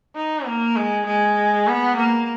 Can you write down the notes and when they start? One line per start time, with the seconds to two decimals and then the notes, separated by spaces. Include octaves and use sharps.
0.15 D#4
0.47 A#3
0.76 G#3
1.06 G#3
1.68 B3
1.97 A#3